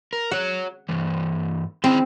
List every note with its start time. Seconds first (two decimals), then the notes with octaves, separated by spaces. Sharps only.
0.13 A#4
0.31 F#4 C#5 F#5
0.89 G2 E3
1.84 D#3 C4 E4 G5